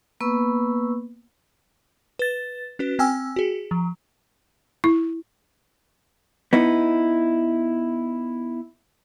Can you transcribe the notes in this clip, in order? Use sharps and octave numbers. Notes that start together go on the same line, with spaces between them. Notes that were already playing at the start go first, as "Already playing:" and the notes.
A#3 B3 B4 B5 C#6 E6
B4 A6
C#4 F#4 B4
C4 G5 G#5 E6
F#4 G#4
F3
E4
B3 D#4 E4